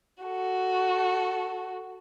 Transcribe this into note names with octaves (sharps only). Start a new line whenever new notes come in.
F#4 A4